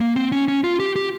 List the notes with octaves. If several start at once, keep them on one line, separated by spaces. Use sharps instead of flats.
A#3
C4
C#4
C#4
F4
G4
G4